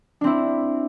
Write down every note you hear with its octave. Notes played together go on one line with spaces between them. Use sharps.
C4 D4 E4